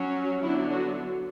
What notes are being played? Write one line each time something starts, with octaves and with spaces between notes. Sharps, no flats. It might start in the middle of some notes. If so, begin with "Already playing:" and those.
Already playing: F#3 C#4
D3 F#3 B3 D4 E4
F#4